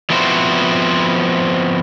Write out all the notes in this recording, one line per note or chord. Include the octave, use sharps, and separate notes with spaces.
F3 B3 C4 E4 F#4 C5